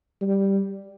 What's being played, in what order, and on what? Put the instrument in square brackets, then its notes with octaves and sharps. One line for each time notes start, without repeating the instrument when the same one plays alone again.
[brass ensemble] G3